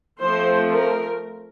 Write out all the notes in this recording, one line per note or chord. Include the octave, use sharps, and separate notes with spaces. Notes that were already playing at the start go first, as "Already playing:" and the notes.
F3 A3 C4 C5
A#4